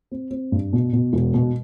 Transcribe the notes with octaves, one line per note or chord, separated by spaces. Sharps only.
C4
C4
G2
B2
B2
E1
B2